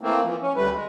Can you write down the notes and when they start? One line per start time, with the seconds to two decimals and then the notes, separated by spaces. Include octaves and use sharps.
0.01 E3 A3 A#3 C4
0.23 E3 F3
0.42 C#4
0.56 D2 G3 A3 B4
0.73 G#3